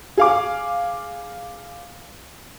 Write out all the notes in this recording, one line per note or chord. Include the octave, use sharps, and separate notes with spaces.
G#4 F5 D6